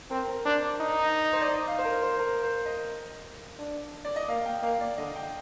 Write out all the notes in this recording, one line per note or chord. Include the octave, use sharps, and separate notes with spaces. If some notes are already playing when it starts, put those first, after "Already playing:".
C4 A#4
A#4
D4 C5
D5
D#4
C5
D5
D#5
F5
C5
A#4
C5
A#4
C5
D#5
D4
D5
D#5
A#3 F5
G5
A#3 F5
D5
D3 D#5
G5